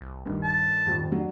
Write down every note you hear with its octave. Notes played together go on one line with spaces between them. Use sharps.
C2
D#1 G2 D#3
A5
D#1 G#1 F2
F#3 D4